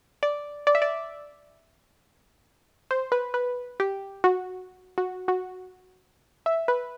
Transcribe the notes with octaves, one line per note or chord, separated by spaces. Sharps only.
D5
D5
E5
D5
C5
B4
B4
G4
F#4
F#4
F#4
E5
B4